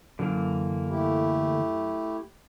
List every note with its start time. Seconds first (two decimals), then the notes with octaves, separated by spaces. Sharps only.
0.19 F#2 D3 E3 A#3
0.89 A3 E4 G4